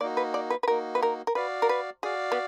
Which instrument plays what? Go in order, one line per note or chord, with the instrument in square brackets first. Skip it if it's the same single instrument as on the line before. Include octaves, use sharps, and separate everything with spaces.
[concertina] A#3 D#4 F#4 [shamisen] D5
[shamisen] B4
D5
B4
B4
[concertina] A#3 D#4 F#4 [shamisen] A#4
[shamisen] B4
A#4
A#4
[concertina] F#4 D5 F5 [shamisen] B4
[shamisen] A#4
B4
[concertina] F#4 D5 F5 [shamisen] G#4
[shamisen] B3